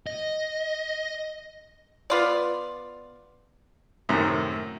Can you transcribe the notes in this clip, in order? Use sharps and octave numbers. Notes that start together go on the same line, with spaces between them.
D#5
B3 F4 D5
F#2 A2 C3 D#3